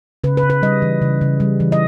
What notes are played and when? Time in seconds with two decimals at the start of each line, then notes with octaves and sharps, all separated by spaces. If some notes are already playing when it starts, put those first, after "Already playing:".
0.24 C#3 B4
0.37 B4
0.43 C#3
0.50 B4
0.62 G3 D#5
0.82 E3
1.02 C#3
1.21 C#3
1.40 G3
1.60 E3
1.72 D#5